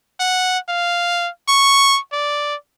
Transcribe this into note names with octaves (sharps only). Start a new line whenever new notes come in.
F#5
F5
C#6
D5